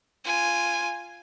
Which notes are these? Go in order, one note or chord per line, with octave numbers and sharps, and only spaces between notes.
F4 G#5